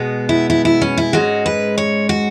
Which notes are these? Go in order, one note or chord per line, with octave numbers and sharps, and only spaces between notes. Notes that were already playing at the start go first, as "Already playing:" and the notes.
Already playing: B2 G#3 B3
E4
E4
E4
C#4
E4
G#2 G#3 C#4 F#4
B4
C#5
F#4